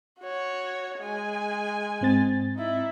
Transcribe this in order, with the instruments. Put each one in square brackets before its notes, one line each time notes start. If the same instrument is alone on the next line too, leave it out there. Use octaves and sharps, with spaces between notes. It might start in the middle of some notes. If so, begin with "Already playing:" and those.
[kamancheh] F#4 C#5
G#3 G#5
[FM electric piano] G#2 C4 A6
[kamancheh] D#4 E4